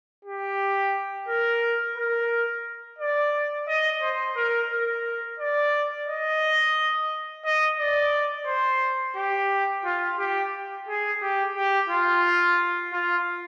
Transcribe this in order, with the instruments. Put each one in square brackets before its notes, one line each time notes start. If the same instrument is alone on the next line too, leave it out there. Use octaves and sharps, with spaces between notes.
[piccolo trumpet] G4
A#4
A#4
D5
D#5
C5
A#4
A#4
D5
D#5
D#5
D5
C5
G4
F4
G4
G#4
G4
G4
F4
F4